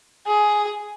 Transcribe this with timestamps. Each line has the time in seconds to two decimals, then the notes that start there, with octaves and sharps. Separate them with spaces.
0.27 G#4